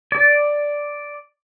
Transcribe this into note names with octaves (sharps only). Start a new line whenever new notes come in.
D5